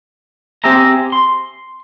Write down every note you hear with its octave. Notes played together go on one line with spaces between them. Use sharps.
C4 G4 G#4 E5 A#5
C6